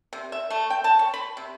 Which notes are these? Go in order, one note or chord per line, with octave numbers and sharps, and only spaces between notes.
C3
E5
A3
G5
A5
C#5
B5
C3